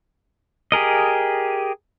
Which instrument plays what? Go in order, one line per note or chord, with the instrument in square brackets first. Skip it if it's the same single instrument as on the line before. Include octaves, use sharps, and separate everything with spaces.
[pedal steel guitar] G4 G#4 A#4 D#5